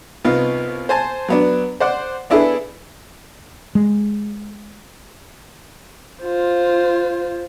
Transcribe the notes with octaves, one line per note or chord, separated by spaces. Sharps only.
C2 B3 D#4 F4
C5 G#5 A5
F#3 B3 D4
C5 D5 F#5
B3 D4 E4 G#4 A4 B4
G#3
F4 C5